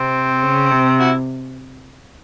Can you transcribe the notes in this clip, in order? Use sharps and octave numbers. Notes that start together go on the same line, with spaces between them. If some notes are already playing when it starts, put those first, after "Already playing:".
Already playing: C3 C4
C#3
C3
E4 F#4